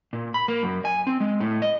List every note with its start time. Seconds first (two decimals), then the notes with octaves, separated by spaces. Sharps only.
0.13 A#2
0.34 B5
0.48 A#3
0.63 F#2
0.85 G#5
1.07 C4
1.20 G#3
1.40 A2
1.62 D#5